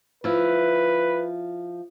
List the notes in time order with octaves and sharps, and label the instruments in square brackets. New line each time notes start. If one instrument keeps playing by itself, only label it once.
[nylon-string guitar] F3 E4 [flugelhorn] B4